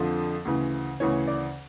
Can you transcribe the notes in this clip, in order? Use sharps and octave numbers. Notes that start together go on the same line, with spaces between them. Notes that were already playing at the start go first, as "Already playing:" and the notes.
Already playing: F2 D3 F3
D2 C#3 E3
D2 C#3 E3 C#5
D5